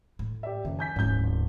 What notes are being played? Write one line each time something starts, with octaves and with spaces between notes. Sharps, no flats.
A2
G4 D5 E5
F#1 D#3
G#5 G6 B6
D1 A1 G#2 G6